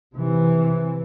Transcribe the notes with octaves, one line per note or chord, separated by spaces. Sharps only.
C3 E3